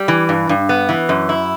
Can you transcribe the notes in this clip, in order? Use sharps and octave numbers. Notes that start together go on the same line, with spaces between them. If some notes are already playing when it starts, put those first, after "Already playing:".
Already playing: G3
E3
G2
G2
B3
E3
F#2
E4